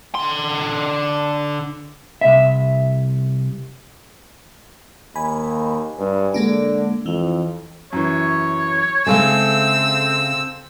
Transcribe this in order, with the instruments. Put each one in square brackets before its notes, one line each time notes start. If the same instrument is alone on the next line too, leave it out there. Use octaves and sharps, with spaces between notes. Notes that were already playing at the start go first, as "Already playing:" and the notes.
[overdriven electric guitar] D3 C6
[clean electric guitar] C2 E5
[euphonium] D#2 [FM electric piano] G#5 B5
[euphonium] G2
[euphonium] D3 [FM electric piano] G#3 A#3 D4
[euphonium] F2 [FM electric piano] E3
[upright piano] F#2 E3 [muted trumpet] C#5
[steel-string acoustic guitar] C#3 G#3 A3 [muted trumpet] C4 [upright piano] G#4 A4 F5 [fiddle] E6